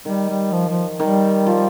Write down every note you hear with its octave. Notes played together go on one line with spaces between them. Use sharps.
D#3 G3
G3
F3
F3
D#3 G3
F3